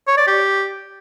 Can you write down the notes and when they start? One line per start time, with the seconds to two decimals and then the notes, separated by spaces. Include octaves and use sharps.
0.08 C#5
0.17 D5
0.27 G4